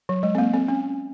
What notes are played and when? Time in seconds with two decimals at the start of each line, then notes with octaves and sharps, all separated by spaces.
0.09 F#3
0.23 G#3
0.35 C4
0.38 A#3
0.54 C4
0.68 C#4